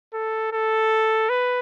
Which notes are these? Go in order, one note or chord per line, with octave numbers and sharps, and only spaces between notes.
A4
A4
B4